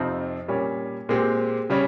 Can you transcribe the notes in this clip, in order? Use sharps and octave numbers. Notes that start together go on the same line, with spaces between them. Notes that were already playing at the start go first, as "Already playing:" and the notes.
Already playing: F2 C3 F3 C4 D#4
A#2 G3 C#4
A#2 G#3 C4 G4
C#3 G3 C#4